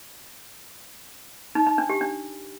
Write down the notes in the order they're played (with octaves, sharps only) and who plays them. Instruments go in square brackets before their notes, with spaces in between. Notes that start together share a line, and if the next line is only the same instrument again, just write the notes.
[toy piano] D#4
D#4
D4
G4
D4